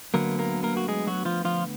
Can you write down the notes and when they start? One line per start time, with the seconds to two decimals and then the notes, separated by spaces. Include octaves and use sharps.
0.14 D2 D3 F#3 A#3 B3 A#4
0.39 A#3 A#4
0.63 A#3 A#4
0.77 F#4
0.88 G#3 G#4
1.07 F#3 F#4
1.25 F3 F4
1.45 F3 F4